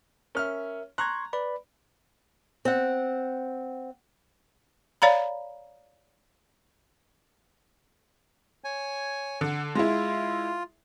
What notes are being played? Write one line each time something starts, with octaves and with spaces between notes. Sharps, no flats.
C#4 A#4 E5 F6
A#5 C6 C#6 F#6 G#6
B4 D5 B5
C4 F#5
C#5 D5 F5 A#5 B5
C#5 G#5
D3 F#5
G#3 E4 F4